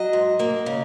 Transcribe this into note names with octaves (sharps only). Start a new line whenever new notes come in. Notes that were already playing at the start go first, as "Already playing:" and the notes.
Already playing: F#3 D#5
G#2
A#3
C#3